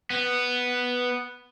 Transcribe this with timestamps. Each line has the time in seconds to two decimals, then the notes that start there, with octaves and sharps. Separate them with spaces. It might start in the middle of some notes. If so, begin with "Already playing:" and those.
0.10 B3